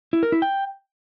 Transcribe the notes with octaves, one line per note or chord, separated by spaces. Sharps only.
E4
A#4
E4
G5